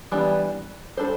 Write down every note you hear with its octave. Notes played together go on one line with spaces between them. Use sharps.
E3 G3 B3 D4
G3 D4 A4 C5